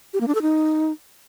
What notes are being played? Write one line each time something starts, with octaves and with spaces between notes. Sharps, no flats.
G4
A#3
D4
A4
D#4